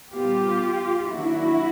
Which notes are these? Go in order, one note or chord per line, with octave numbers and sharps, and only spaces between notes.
A#2 G3 B3 F4 G4
D#3 F#3 A#3 D4 E4 F#4